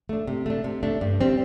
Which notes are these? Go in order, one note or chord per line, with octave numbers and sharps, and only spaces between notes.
A3 D4
C3
A3 D4
C3
A3 D4
G2
G3 C4